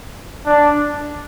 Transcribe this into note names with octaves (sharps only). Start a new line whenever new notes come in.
D4